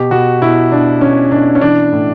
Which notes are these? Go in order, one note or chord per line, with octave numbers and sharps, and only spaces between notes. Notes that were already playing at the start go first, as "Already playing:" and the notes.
Already playing: B2 G4
B2 F#4
B2 E4
B2 D4
B2 C#4
B2 D4
C#4
E3 D4
A2